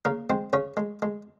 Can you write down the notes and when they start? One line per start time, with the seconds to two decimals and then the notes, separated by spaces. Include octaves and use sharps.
0.05 C#3 A#3 A#4
0.30 G#3 C4 C5
0.53 C#3 C#4 C#5
0.77 G#3
1.02 G#3